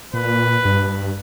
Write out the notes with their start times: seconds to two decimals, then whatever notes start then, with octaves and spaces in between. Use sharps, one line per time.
0.14 A#2 B4
0.65 G2